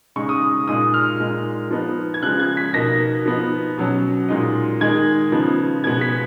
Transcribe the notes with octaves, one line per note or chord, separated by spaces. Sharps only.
C#3 G#3 D#4 C#6
D#6
A#2 G#3 D#4 D#6
F6
A#2 G#3 D#4
F3 B3 D#4
G#6
C#3 F3 G#3 F#6
G#6
B6
B2 A#3 D#4 A#6
F3 B3 D#4
B2 F#3 C#4
A#2 G#3 D#4
D#3 G#3 D#4 G#6
C#3 F3 B3 D#4
B2 G#3 B3 G#6
B6